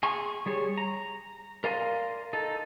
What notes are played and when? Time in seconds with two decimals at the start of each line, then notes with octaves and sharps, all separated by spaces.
0.03 G#4 G#5 C6 C#6
0.46 G3 G#4 C#5
0.78 A#5
1.64 A#4 D5 F5 G#5 C6
2.33 D#4 A4